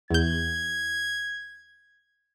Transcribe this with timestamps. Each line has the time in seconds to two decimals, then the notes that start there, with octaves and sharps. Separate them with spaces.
0.11 E2 G6 G#6